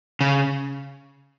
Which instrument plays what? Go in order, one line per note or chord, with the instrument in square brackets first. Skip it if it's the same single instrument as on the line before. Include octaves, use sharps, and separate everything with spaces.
[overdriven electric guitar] C#3